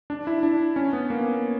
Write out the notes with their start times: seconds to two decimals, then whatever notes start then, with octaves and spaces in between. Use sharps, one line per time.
0.10 D4
0.27 E4
0.43 D4
0.76 C#4
0.93 B3
1.10 A#3